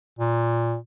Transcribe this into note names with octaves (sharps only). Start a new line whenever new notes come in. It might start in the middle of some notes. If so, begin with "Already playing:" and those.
A#2